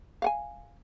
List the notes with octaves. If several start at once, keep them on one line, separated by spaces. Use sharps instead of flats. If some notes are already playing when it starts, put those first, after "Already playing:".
F5 F#5 G#5